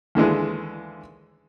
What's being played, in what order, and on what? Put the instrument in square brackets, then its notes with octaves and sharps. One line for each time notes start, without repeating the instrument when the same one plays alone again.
[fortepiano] D#2 D3 E3 G#3